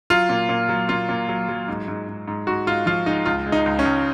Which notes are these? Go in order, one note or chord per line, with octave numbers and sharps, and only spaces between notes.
F#3 F4
A#2
A#2
F#3
A#2 F4
A#2
F#3
F#3
G#2
G#2
G#2
G#2
G#2 F#4
G#2 F4
F3 F4
G#3 D#4
C#2 F4
G#3
D#4
C#2
C#4
C#2